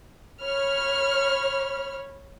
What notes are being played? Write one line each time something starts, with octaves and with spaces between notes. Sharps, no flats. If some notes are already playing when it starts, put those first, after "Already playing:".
C#5 B5 F6